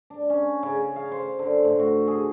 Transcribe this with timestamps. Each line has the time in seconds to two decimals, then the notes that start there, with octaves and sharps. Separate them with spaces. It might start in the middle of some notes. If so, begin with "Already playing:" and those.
0.10 D4
0.30 C#4
0.63 C#3
0.96 F5
1.12 C5
1.39 D3
1.64 A2
1.79 F#4
2.07 G#4